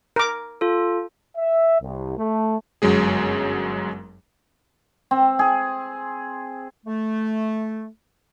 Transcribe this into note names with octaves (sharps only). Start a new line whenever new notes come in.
A#4 D6
F4 A4
E5
C2
A3
G1 F#2 F#3 G#3 G#4
C4
G#4
A3